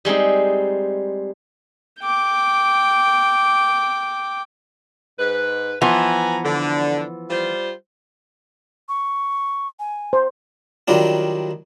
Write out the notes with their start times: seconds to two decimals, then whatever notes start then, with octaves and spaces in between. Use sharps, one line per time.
0.05 G3 G#3 C4 D#4
2.00 G5 D6
5.19 G#2 B4
5.81 E3 F3 B3 B4 G#5 A#5
6.44 D3
7.30 G3 F4 C5
8.89 C#6
9.79 G#5
10.13 C5
10.88 D#3 F#3 G3 D4 F4